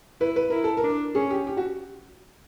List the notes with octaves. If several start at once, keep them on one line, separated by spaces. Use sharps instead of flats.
E4 B4
B4
E4 A#4
A4
A#4
D4
C#4 G#4
G4
G4
F#4